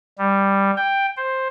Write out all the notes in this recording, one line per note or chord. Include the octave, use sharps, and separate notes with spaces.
G3
G5
C5